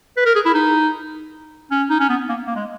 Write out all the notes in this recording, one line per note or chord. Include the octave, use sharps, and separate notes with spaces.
B4
A#4
G#4
E4
D#4
C#4
D#4
C#4
B3
A#3
A#3
G#3